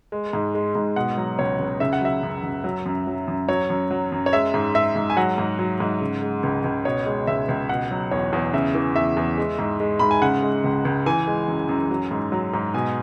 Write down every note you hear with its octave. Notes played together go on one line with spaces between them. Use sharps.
G#3
G#2
G#3
G#2
B2 F#5
F#3
C#2 C#5
C#2
C#3 E5
F#5
F#3 E5
F#2
F#2
F#3
F#2
F#3
F#2
F#3 C#5
F#2
F#3
F#2
C#5
G#3 E5
G#2
G#3 E5
G#2
G#5
F#3 F#5
G#2
F#3
G#2
C#3
G#3
C#2
C#2
B2 C#5
G#3
C#2 E5
C#2
B2 F#5
F#3
E2 C#5
E2
C#3 E5
E3
E2 E5
E2
G#3
G#2
G#3
G#2 B5
G#5
C#3 F#5
G#3
C#2
C#2
E3 G#5
G#3
F#2
F#2
F#3
G#2
F#3
G#2
B2 G#5